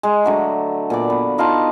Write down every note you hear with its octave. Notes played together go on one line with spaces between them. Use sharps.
G#3
D3 F#3 A3
A#2 B3 D5
B3
D#4 F4 G4 A5